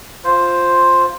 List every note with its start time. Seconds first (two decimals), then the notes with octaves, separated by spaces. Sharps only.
0.24 F4 C5